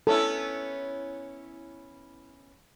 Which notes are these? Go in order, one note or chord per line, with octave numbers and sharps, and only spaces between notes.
B3 C#4 E4 A4